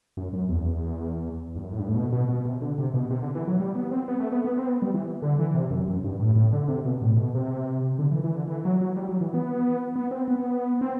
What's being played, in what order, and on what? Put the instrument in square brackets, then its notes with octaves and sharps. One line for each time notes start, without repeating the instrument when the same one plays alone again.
[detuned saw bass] F#2
F#2
E2
G2
F#2
A2
G2
A2
B2
B2
B2
C3
D3
C3
B2
C3
D3
E3
F#3
G3
B3
C4
B3
A3
B3
B3
C4
B3
G3
E3
D3
E3
C3
F#2
F#2
G2
A2
A2
D3
C3
B2
A2
B2
C3
D3
E3
E3
D3
E3
F#3
F#3
G3
F#3
E3
B3
B3
C4
B3
C4